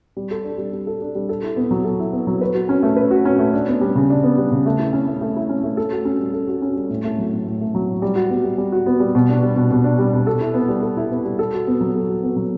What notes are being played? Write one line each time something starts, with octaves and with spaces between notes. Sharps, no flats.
G3
A4
D4
G3
G3
A4
D4
G3
A4
E4
B3
F#3
A4
E4
B3
F#3
B4
F#4
C#4
A3
B4
F#4
C#4
A3
D4
B3
G3
C#3
D4
B3
G3
C#3
A3
E4
C#4
A3
A3
E4
C#4
A3
A4
F#4
C#4
G3
A4
F#4
C#4
G3
A2
A3
F#3
A2
A2
A3
F#3
A2
G3
F#4
B3
G3
G3
F#4
B3
G3
B2
D4
G3
B2
B2
D4
G3
B2
A4
E4
B3
G3
A4
E4
B3
G3
A4
F#4
B3
F#3
A4
F#4
B3
F#3